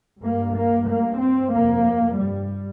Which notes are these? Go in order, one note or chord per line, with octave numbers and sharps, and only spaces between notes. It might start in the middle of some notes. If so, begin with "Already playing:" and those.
G2 A#3
A#3
G2 A#3
C4
F2 C3 A#3
G2 G3